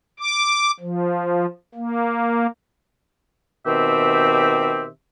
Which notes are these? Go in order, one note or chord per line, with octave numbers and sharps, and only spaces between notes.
D6
F3
A#3
B2 D#3 C4 G4 E5